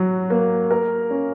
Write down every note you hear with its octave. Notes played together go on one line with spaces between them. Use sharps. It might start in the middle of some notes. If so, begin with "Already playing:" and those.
Already playing: F#3 F#4
A#3
A#4
C#4